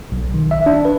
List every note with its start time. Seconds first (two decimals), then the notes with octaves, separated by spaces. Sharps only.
0.12 B1
0.34 D#3
0.51 E5
0.66 D4
0.85 B4